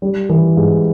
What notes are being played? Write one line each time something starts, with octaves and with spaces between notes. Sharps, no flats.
G3
E3
G#2